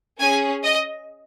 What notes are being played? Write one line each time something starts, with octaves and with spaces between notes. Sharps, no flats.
C#4 G#4 G#5
D#5